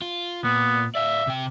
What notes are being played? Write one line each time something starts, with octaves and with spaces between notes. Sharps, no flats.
F4
A#2 B3
D5 E5 F5
C3 G5